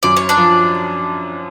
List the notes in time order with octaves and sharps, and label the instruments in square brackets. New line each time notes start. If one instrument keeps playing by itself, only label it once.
[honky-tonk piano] F#2 [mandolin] D5
[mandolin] C#5
D4 D5
[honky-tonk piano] F3